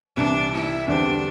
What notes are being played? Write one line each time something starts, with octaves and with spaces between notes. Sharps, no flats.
C2 C3 E3 B3 D4
E4
E2 D3 G3 C4 D4